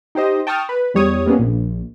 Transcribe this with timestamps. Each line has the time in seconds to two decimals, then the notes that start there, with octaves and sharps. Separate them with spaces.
0.15 D#4 G4 C5 D#5
0.47 G5 A5 C#6 D#6 F6
0.69 B4
0.94 E2 G3 C#5 D#6
1.26 G3 A#3 B3 C#4 G#4
1.39 A#1